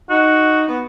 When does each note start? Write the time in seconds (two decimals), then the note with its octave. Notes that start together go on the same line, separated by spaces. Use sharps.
0.10 D#4 F#4
0.68 B3